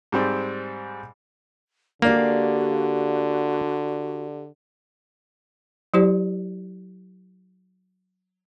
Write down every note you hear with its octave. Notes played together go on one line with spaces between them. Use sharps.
G#2 G3 C4
D3 A#3 F#4 G4 D5 F5
F#3 E4 G4 C5 D5